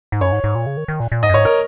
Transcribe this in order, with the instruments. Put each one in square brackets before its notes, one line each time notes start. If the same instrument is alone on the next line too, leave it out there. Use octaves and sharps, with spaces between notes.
[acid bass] G#2
[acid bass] F#2 [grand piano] C#5
[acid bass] G#2
G#2
A#2
C#3
D#3
D#3
A#2
A#2
[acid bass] G#2 [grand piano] D#5
[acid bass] F#2
[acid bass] G#2 [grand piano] C#5
[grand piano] A#4